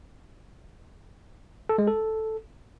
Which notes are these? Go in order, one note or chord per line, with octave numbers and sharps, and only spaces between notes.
A4
G#3
A4